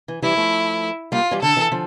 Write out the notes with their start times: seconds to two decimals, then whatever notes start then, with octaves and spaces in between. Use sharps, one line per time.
0.08 E3
0.22 E3 G3 E4
0.37 F3 A3
1.12 G3 A#3 F4
1.31 E3 G3
1.42 D3 A4
1.57 E3
1.72 D3 F3